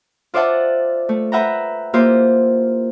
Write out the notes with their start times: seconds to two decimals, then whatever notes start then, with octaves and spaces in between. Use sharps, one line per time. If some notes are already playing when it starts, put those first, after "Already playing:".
0.34 F4 C5 D5 E5 F#5 A5
1.09 A3
1.32 B4 E5 F#5 G5 A#5
1.93 A#3 E4 F4 G4 C5